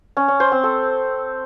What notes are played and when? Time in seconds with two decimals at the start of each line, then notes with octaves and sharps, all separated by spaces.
0.17 C#4
0.28 C#4
0.40 C5
0.52 C4
0.63 A4